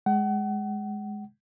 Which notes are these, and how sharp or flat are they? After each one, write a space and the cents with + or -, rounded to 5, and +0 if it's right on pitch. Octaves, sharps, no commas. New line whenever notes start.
G#3 +0 F#5 +35